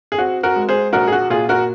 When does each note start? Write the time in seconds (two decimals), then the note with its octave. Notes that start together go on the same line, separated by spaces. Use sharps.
0.12 G#4
0.18 C4 F#4
0.43 F#4 A#4
0.56 G#3
0.69 G#4 C5
0.93 A#1 F#4 A#4
1.08 G#4
1.12 F#4
1.30 A#2 F4 G#4
1.49 F#4 A#4